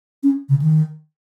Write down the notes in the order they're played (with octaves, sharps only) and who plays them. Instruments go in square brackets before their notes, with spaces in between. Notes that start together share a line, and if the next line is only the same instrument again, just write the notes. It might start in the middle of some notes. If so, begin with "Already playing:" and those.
[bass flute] C#4
C#3
D#3